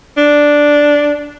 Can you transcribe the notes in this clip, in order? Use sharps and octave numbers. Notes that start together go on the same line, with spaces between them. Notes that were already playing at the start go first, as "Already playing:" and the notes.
D4